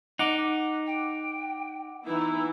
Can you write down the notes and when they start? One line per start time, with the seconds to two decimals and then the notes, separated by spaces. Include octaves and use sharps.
0.19 D#4 F#5 D6
0.86 G5
2.06 E3 B3 D#4 E4